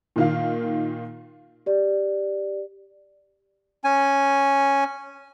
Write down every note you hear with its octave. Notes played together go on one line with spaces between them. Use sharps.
A#2 D#3 F5
G4 D5
C#4 G#5